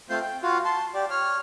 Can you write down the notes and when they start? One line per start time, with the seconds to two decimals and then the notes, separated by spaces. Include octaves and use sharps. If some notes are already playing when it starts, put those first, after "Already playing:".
0.10 A3 C4 F4 C5 C6 G6
0.21 G5
0.42 F4 F#4
0.65 A5 C6
0.94 G4 D5
1.10 C#5 F6